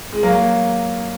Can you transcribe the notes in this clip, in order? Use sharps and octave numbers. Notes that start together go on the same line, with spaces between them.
G#3
F#3 A#3